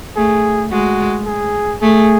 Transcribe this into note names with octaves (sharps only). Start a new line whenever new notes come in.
A3 G#4
G#3 F#4
G#4
A3 G#4